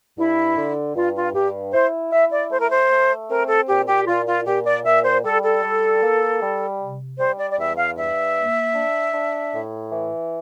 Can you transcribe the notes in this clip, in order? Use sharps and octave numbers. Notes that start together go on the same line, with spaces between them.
G2 E4
D3
G2 F4
F4
G2 G4
E4 C5
E4 E5
D5
A3 C5
A#4
C5
A3
C4 A#4
A4
A#2 G4
G4
A#2 F4
F4
A#2 G4
D5
A#2 E5
C5
G3 A4
A4
G3
A#3
G3
C3
G3 C5
D5
D5
E2 E5
F5
G2 E5
A#3
D4
D4
A2
E3